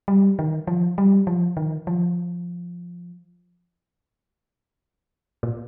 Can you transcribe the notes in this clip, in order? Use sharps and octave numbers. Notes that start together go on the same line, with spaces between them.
G3
D#3
F3
G3
F3
D#3
F3
A#2